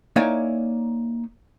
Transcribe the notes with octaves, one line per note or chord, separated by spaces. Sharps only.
A#3 D#4 E4 C#5 D5 G#5